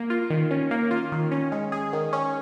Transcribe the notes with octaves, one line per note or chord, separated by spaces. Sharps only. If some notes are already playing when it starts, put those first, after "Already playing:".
Already playing: A#3
F4
D#3
C#4
A#3
F4
D#3
C#4
G#3
G#4
D#3
C#4